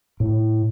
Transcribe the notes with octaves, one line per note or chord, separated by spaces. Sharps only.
A2